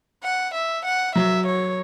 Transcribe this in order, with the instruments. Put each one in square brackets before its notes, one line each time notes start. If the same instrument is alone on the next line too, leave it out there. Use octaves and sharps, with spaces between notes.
[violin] F#5
E5
F#5
[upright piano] F#3 [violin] E5
[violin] C#5